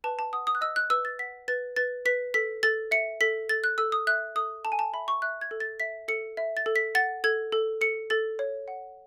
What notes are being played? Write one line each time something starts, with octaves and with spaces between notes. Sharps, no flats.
B4 A5
A5
F#5 D#6
D#6
F#6
D#5 E6
F#6
B4 E6
A6
F#5 B6
B4 A6
B4 A6
B4 B6
A4 B6
A4 A6
E5 C#7
A4 B6
A4 A6
F#6
A4 E6
D#6
E5 F#6
A4 D#6
A4 A5
G#5
A5
E5 B5
C#6
E5 F#6
G#6
A4
A6
E5 B6
A4 C#7
E5
A6
A4
B6
F#5 A6
A4 G#6
A4
A4 C#7
A4 A6
C#5
F#5